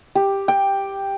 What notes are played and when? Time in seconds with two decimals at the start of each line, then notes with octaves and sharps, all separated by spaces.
0.15 G4
0.48 G5